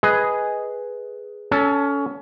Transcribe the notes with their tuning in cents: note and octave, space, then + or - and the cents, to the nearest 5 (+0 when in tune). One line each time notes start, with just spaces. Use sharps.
G#4 +0 B4 +0 D#5 +10
C#4 +20 A4 +0